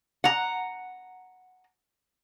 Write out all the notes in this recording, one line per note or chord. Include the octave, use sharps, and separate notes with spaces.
F#5 A#5